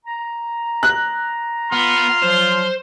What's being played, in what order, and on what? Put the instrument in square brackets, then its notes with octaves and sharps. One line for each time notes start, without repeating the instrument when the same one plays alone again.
[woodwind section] A#5
[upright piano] F#6
[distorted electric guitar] B3 [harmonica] C6 F6
[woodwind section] F3 F#3 [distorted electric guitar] C5